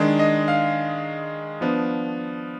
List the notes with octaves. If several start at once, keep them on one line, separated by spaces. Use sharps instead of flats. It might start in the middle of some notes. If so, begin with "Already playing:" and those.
Already playing: D#3 G#3 D4
D#5
F5
F3 B3 D4